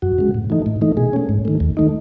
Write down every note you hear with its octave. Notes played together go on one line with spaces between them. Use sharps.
F#2 F#4
C#3 G#3
A2
E3 A3 D#4
A2
E3 A3 D#4
B2 G#4
A3 C#4
G#2
D#3 A3
D#2
D#3 A3 D#4